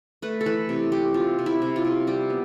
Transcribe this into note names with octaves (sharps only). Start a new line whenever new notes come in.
A3 B4
A4
E3 B4
C3
C3 G4
C3 F4
C3
E4
C3
F4
C3
G3 G4
B3